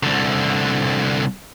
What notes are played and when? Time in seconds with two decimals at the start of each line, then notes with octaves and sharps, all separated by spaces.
0.03 C2 D3